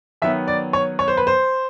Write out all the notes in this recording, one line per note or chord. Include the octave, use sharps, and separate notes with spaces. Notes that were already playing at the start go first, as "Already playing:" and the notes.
D#3 F#3 B3 E5
D5
C#5
C#5
C5
B4
C5